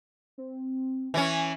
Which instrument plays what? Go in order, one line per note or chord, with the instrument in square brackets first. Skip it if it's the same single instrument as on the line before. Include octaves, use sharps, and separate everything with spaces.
[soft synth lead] C4
[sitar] E3 C#4 [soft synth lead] G#5